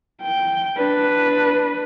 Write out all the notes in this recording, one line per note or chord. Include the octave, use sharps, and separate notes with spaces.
G5
D4 B4